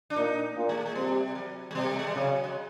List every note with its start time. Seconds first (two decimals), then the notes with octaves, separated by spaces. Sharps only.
0.10 D4
0.16 A#2 D#4
0.56 A#2
0.69 G#3
0.77 A3
0.86 G#3
0.95 C3 G3
1.35 F#3
1.71 G#3
1.75 C3 G3
1.83 A#3
1.92 A3
1.99 G#3
2.07 G3
2.15 C#3 F#3
2.44 G#3